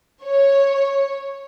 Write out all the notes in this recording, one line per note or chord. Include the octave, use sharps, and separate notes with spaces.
C#5